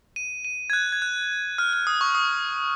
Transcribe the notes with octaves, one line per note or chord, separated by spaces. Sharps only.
D#7
D#7
G#6
F#6
G#6
F#6
F6
F6
D#6
C#6
D#6